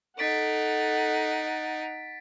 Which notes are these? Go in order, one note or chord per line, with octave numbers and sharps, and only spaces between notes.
D#4 A4 F#5 A6 B6 D7